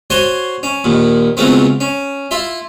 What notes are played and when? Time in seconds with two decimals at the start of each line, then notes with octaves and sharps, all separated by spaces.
0.10 F#4 C5 C#5 G#5 A5 C6
0.63 C#4
0.84 A#1 D#2 A#2
1.37 C#2 C#3 F#3 A3 B3 C4
1.80 C#4
2.31 E4 F4 E5